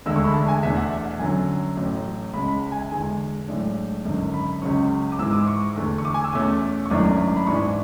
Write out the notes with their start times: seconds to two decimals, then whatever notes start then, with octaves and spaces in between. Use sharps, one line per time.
0.06 E1 D2 D3 G#3 E6
0.16 C#6
0.24 B5
0.34 A5
0.48 G#5
0.63 E2 B2 A3 D4 E5
0.76 F#5
0.91 E5
1.05 F#5
1.19 F#2 D3 F#3 G#5
1.77 A1 A2 F#3
2.34 C#2 C#3 G#3 B5
2.48 B5
2.72 G#5
2.82 E5
2.91 E2 D3 G#3 G#5
3.48 B1 A2 G#3 D4
4.05 G#1 F#2 D3
4.34 B5
4.62 C#2 C#3 F#3 C#4 C#6
5.12 D6
5.19 G#2 E3 G#3 E6
5.33 D6
5.48 C#6
5.76 E2 D3 A3
5.98 C#6
6.05 D6
6.14 G#5
6.24 E6
6.33 E2 B2 A3 C#4 D6
6.86 C#6
6.90 G#1 F#2 E3 A3 D4 D6
7.36 B5
7.47 G#2 E3 G#3 D4 C#6